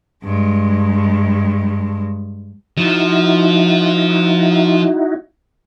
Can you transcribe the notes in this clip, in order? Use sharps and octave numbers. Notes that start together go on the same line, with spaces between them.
G2 G#3
F3 D#4 E4 F#4